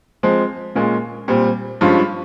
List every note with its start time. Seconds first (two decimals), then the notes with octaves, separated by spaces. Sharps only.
0.23 F3 G#3 C4
0.75 A#2 G#3 C#4 F4 A#4
1.28 A#2 G3 C4
1.81 G2 F3 G#3 C#4 F4